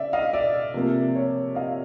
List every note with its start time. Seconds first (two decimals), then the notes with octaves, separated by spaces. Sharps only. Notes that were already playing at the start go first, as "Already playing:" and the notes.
Already playing: C#3 D5 E5
0.13 D#5 F5
0.33 D5 E5
0.74 C3 F3 A#3
1.15 C#5
1.55 D#5 F5